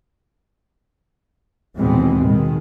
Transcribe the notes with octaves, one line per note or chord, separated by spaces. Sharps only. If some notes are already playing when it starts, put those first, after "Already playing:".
D#2 B2 E3 G#3 B3 C4
B2 D#3 G#3